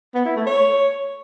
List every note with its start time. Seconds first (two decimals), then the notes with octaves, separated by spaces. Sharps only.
0.15 B3
0.25 E4
0.36 A3
0.47 C#5